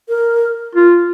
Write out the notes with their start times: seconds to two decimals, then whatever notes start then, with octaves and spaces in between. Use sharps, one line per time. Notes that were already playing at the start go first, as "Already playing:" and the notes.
0.09 A#4
0.75 F4